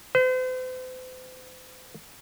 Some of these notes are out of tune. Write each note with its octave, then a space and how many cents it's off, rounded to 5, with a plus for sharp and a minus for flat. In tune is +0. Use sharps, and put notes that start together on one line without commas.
C5 -40